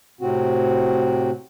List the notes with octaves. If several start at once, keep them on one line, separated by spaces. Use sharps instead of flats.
A2 C3 C4 F#4